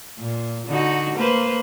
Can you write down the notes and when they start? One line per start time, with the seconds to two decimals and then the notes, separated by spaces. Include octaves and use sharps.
0.19 A#2
0.67 D3 D#4 F#4
1.16 A#3 B4 C5